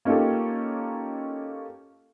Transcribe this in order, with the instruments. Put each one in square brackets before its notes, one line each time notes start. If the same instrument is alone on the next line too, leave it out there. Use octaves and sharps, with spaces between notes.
[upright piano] A#3 C#4 D#4 F4 G4 A4